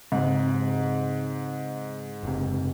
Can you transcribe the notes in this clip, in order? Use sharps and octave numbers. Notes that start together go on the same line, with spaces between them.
G#2 C#3 C4
F#1 C3